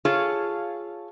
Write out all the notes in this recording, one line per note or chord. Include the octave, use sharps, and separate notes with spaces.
F4 G#4 A4 C#5 F5